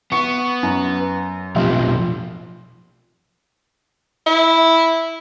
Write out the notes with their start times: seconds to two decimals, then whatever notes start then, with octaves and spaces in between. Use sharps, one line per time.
0.12 B3 C#6 C#7
0.63 F#2
1.56 F1 B1 F3
4.26 E4